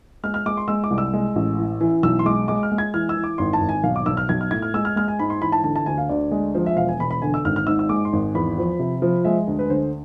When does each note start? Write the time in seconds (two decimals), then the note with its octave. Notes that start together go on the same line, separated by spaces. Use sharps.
0.23 G#3 F6
0.34 F6
0.46 G#3 D6
0.57 C6
0.68 G#3 E6
0.84 D6
0.90 C2
0.98 E6
1.13 G#3
1.36 A1
1.58 E3
1.81 E3
2.03 B1 E6
2.19 C6
2.25 G#3 D6
2.48 G#3 D6
2.63 F6
2.72 G#3
2.78 G#6
2.94 E3 F6
3.09 E6
3.17 E3
3.24 D6
3.38 G#1 C6
3.53 A5
3.61 G#1
3.69 G#5
3.84 B1 F5
3.96 D6
4.06 B1 E6
4.17 F6
4.29 B1 G#6
4.41 F6
4.51 A2 G#6
4.62 F6
4.74 G#3 E6
4.85 F6
4.96 G#3 F6
5.08 G#5
5.19 G#2 B5
5.30 C6
5.41 E3 B5
5.52 A5
5.64 D3 A5
5.76 A5
5.86 D2 G#5
5.98 F5
6.09 D2 D5
6.31 G#3
6.55 F3 C5
6.66 E5
6.76 E1 F5
6.89 G#5
7.00 E1 B5
7.11 B5
7.22 D3 G#5
7.34 E6
7.45 G#1 F6
7.56 F6
7.67 G#2 E6
7.79 E6
7.89 G#3 D6
8.05 C6
8.13 G#1
8.35 E2 B5
8.58 F3
8.79 C3
9.02 F3
9.25 G#3 E5
9.47 D2
9.59 B4
9.70 D3 C5